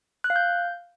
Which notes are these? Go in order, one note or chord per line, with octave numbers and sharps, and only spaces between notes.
F#6
F5
G6